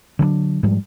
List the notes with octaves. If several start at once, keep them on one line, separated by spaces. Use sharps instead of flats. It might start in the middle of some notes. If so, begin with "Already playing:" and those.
D3 F#3 G#3 D4
G#2 F3 G3 G#3